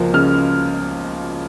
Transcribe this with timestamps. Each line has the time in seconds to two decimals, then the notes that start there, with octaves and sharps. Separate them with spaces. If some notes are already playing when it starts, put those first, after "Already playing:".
Already playing: C#2 F3 A#3
0.13 C#3 F6